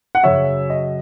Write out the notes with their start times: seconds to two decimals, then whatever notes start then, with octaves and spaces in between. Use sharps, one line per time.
0.15 F#5
0.23 F#2 C#3 F#3 C#5 E5
0.70 D#5